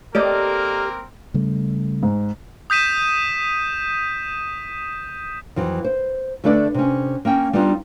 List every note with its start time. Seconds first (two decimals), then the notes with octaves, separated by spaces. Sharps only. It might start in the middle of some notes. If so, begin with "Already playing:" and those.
0.15 A#3 C4 G4 A4 A#4 D5 D#5
1.34 C#3 G3 A3
2.03 G#2
2.70 D#6 G6 B6 D#7 E7
5.56 F2 E3 F#3
5.84 C5
6.44 D3 A3 D4 A4 B4 D5
6.74 C3 C#4
7.25 A#3 C#4 G5
7.53 G3 B3 D4 D#4 F4